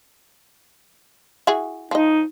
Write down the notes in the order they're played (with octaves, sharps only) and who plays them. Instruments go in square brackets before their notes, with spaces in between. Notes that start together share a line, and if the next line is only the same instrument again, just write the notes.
[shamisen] E4 F#4 G#4
[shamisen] F3 D#5 [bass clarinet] D#4